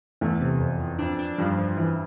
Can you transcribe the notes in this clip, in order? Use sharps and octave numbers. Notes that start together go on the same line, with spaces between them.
E2 A3
C3
F2
F2
F2 D4
D4
G2 F3
F3
E3